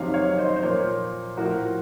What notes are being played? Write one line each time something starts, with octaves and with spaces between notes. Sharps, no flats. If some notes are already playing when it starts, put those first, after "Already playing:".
Already playing: F2 C3 D#3 F#3 C#5 F5
C#5 F5
C5 D#5
C5
A#2 F3 A#4 C#5
A2 F3 F#4 A#4